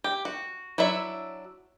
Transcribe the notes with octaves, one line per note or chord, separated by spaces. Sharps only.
G4
F#4
F#3 D4 E4 E5